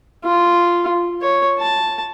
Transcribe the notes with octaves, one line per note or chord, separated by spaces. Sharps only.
F4
C#5
A5